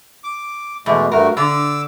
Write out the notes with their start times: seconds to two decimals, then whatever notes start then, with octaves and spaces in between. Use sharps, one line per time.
0.24 D6
0.86 E2 B2 G#3 A3
1.12 G2 A3 F#4 A#4
1.37 D3 D6 E6